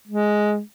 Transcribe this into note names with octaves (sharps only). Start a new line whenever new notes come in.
G#3